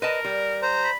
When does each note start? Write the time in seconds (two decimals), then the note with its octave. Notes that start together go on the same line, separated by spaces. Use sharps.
0.02 A#4 B4 D#5 A5
0.25 G3
0.62 C5 A#5
0.84 B5